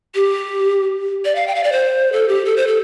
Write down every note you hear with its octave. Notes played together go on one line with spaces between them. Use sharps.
G4
D5
F5
G5
F5
D5
C5
A4
G4
A4
C5
A4